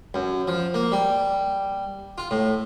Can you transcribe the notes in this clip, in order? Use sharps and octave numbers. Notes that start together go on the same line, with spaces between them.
F#2
F3
A#3
G3
F4
A2